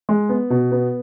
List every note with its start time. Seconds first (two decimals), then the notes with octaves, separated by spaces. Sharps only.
0.09 G#3
0.29 B3
0.50 B2
0.72 B3